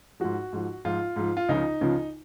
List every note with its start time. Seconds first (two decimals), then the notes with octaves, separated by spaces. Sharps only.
0.20 G#2 F3 F#4
0.53 G#2 F3
0.85 G#2 F3 F4
1.16 G#2 F3
1.37 F4
1.48 C#2 C#3 F3 D#4
1.81 C#2 C#3 F3